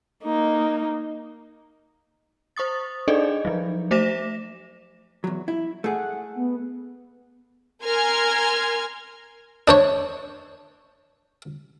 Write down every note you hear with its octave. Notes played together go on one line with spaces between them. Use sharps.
A#3 D#4
C5 C#6 D#6 A6
D4 D#4 G#4 A4 D5 D#5
F3 F#3
A3 C5 E5 D6 A#6 E7
E2 F#3
E4
A3 G#4 F#5
B3
A#4 G#5 C6 F6 G#6
D4 C5 C#5